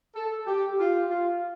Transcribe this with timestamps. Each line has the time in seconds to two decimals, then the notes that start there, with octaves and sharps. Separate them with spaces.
0.15 A4
0.47 G4
0.79 F4
1.10 F4